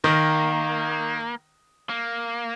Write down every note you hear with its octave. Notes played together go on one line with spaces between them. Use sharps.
D#3 A#3
A#3